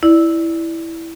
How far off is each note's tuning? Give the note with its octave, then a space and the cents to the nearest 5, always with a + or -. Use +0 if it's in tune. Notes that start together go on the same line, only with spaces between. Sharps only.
E4 +0 D5 +5